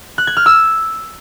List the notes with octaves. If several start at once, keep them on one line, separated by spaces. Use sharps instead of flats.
F#6
G#6
F6
E6